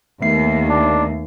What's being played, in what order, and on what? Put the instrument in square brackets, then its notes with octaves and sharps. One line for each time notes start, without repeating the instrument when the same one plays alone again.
[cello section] D#2 [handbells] A3 B3 C7
[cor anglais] D4